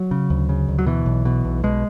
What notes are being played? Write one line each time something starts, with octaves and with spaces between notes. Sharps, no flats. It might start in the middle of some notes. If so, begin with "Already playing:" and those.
Already playing: F#3
C#3
D2
C#3
D2
F#3
B2 E3
B1
B2
B1
B2 G#3